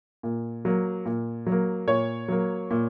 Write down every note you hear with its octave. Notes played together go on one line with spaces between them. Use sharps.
A#2
F#3 A#3
A#2
F#3
A#3
A#2 C#5
F#3 A#3
A#2